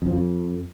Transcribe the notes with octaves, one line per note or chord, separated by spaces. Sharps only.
F2
F3
F2